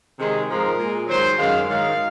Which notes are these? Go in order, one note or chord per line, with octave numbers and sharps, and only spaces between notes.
C3 D#3 G#3 G#4
G#2 F3 G#3 A#4
A#2 G#3
G#2 D#3 F#3 C5
F#2 D#3 G#3 F5
G#2 D#3 F#3 F5